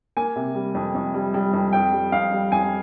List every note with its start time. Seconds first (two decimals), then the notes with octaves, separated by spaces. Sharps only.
0.17 A#3 G#5
0.36 C3
0.55 G3
0.75 F2
0.95 F2
1.14 G3
1.34 G3
1.53 F2
1.73 F2 G5
1.92 G3
2.12 F2 F5
2.32 G3
2.52 F2 G#5